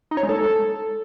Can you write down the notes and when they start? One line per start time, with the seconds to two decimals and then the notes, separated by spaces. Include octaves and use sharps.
0.11 D#4
0.17 C#5
0.23 G#3
0.29 A4